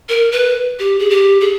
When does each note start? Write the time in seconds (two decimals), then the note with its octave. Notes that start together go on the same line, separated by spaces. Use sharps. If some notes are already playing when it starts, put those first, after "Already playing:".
0.09 A#4
0.32 B4
0.79 G4
0.99 G#4
1.10 G4
1.41 G#4